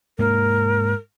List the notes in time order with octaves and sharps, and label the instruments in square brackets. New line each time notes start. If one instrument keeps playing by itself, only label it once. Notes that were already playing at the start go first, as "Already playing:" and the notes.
[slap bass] G#2 A#3 [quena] A#4